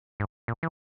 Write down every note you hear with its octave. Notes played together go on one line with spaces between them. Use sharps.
G#2
A#2
E3